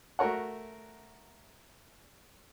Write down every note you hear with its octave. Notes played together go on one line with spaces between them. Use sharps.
A3 F#4 A#4 C#5 F#5